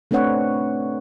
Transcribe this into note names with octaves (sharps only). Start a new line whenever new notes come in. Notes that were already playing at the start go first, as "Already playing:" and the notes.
A3 C4 D4 B4 C#5 F#5